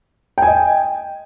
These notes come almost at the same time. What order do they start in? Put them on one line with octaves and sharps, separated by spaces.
G5 G#5 D#5